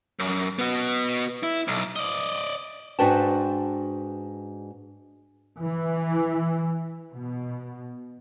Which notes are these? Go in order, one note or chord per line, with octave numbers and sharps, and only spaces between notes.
F#2
B3 F#4
E4
B1
D5 D#5
G#2 D4 F#4 B4 G5 A5
E3
B2